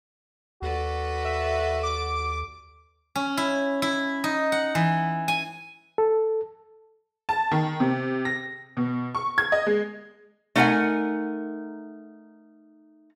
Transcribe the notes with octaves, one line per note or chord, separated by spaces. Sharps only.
D#2 F#4 A4 B4 D5
E5
D6
C#4
E4
E4
D#4
F#5
E3
G#5
A4
A5
D#3
C3
A#6
B2
C#6
G#6
D#5
G#3
A3 D#4 A#4 F5 F#5 G#5